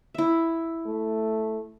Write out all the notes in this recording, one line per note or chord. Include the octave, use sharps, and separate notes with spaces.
E4 E5
A3